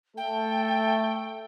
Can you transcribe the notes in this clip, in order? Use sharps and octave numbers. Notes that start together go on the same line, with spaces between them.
A3 A4 G5